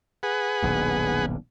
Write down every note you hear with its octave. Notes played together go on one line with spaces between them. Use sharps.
G#4 B4 F#5
D#1 B1 G2